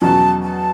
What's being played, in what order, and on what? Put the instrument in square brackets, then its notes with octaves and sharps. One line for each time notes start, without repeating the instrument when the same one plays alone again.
[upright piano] E2 B2 F#3 C#4 [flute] A5
[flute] A5